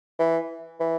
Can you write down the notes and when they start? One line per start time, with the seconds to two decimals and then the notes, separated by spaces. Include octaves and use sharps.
0.19 E3
0.80 E3